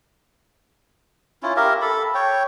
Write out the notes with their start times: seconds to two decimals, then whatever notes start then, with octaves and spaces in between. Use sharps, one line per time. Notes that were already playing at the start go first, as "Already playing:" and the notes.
1.43 C#4 E4 F4
1.56 G4 A#4 E5 F5
1.82 A4 B5
2.14 C#5 G5